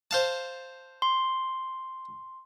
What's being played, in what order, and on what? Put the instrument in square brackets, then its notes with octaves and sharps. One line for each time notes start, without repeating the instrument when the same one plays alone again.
[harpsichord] C5 F5 A5
[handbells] C6